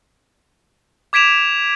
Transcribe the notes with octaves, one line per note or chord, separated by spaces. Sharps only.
D6 G#6 B6 D7 E7 F7